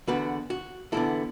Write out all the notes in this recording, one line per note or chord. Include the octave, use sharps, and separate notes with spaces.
E2 D3 B3 F#4 B4
F#4
E2 D3 B3 E4 A4